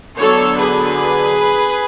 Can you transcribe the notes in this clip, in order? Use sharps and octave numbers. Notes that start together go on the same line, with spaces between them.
D3 F#3 B3 D4 A4 C#5
G#4 B4